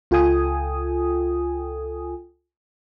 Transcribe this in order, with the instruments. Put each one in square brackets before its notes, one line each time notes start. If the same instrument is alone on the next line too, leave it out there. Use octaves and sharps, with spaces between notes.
[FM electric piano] C#2 F4 A4 G5 G#5 D#6